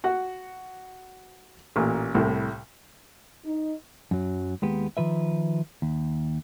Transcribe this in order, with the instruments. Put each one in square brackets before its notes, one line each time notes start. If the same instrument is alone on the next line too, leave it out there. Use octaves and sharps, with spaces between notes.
[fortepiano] F#4 F#5
A1 A#2
C2 A2
[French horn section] D#4
[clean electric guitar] F#2 F#3
D#2 G#3 B3 G4
D#3 F3 B4 E5
D#2